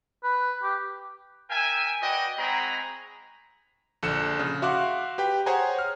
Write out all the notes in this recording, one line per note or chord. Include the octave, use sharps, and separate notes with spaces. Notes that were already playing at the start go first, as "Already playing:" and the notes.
B4
G4
A#4 E5 G5 G#5
F#4 B4 D5 D#5 G5
G#3 C4 F#4 G#4 A#5 B5
A#1 D3 A4 F#6 C#7 E7
C#3
F#4 E5 F5 C6 D6 F#6
G4 B4 G5
G#4 C5 C#5 F#5 G#5 A#5
F6